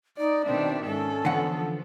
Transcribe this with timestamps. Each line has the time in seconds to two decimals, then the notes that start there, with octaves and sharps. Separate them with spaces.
0.17 D#4 D5
0.46 B2 D#3 C4 D4 E5
0.86 G#2 C#4 A4
1.25 D3 E3 F3 B3 F#5